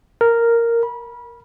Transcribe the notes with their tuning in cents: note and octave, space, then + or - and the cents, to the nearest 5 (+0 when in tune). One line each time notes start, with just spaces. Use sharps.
A#4 -5
B5 -25